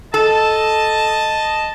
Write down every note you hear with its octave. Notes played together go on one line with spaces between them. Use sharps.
A4 D#5 A5